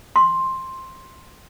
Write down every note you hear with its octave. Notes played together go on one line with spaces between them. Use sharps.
C6